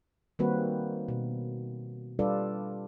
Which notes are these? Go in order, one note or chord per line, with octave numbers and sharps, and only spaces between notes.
D#3 G3 A#3 C4 F#4 B4
B2
G3 D4 F4 A4 B4 D5